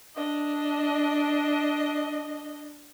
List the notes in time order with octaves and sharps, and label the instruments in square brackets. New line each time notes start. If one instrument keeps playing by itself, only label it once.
[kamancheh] D4 D#5